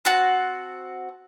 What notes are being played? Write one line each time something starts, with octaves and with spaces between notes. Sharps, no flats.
C4 F#4 F#5 A5